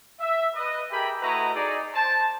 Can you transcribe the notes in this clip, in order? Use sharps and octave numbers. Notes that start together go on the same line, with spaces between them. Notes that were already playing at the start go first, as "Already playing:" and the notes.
E5
B4 D#5
G4 G#4 A#4 E5 G5 B5
A3 E4 F#4 B4 D#5 A#5
D#4 G#4 D5
C5 A5